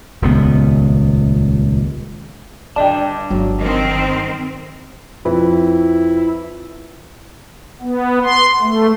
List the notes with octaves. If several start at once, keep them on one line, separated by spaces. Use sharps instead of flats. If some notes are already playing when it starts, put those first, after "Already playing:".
D#1 C#2 B3
G2 D3 D4 D5 D#5 G5 A5
G1 F#3
D#3 C4
F2 E4 B4
B3
C6
A3